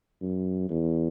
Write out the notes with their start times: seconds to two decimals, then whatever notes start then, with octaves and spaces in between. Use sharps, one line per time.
0.22 F#2
0.70 E2